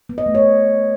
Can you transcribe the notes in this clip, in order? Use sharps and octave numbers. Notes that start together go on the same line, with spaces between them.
B3
D#5
A3
C#5